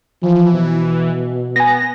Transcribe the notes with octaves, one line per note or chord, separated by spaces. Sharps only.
E3 F3
B2
B3 G#5 A#6